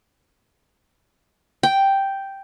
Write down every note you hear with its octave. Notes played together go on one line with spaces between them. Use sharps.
G5